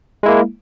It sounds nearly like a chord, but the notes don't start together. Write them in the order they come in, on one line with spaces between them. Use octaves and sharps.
G#3 E4 A#3